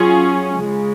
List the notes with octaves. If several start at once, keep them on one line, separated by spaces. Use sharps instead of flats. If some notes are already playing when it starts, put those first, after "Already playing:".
Already playing: F#3 C#4 F4 G#4
C#3 G#3